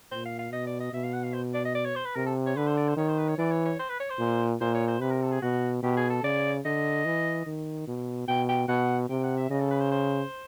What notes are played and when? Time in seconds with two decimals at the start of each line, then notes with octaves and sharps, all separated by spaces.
0.11 A#2 C5
0.25 F5
0.39 F5
0.52 B2 D#5
0.67 D5
0.80 D#5
0.93 B2 E5
1.03 F5
1.13 F#5
1.24 F5
1.34 C5
1.54 D5
1.65 D#5
1.75 D5
1.85 C#5
1.96 C5
2.05 B4
2.15 C3 A#4
2.26 A4
2.46 C#5
2.56 D3 B4
2.67 C5
2.77 D5
2.88 C5
2.97 D#3 C#5
3.08 C5
3.18 B4
3.28 C#5
3.38 E3 D5
3.51 C#5
3.65 C#5
3.79 C5
3.89 B4
4.00 C#5
4.10 C5
4.19 A#2
4.61 A#2 C5
4.74 C#5
4.88 C5
5.01 C3 B4
5.11 A#4
5.22 A4
5.32 G#4
5.42 B2 F#4
5.83 B2 G4
5.97 G#4
6.10 A4
6.23 C#3 D5
6.65 D3 D#5
7.05 E3
7.46 D#3
7.88 B2
8.27 B2 G5
8.49 G5
8.68 B2 F#5
9.09 C3 G5
9.23 F#5
9.37 E5
9.50 C#3 D#5
9.60 A4
9.70 B4
9.81 C5
9.92 C5